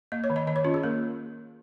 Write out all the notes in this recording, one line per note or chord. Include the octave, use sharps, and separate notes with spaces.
A#3 D#5
C#5
D#3
D#5
D#3 D#5
C#5
C#4 F4
G#4
A#3 A#4